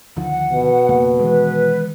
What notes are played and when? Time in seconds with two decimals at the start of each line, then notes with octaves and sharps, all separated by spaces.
0.17 D2 D#3 F3 F#5
0.53 B2
0.89 F2 C#3 A#3
1.19 D#3 E3 G#3 B4